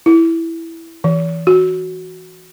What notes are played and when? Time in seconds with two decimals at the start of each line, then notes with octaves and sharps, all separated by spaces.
0.06 E4
1.04 E3
1.47 F#4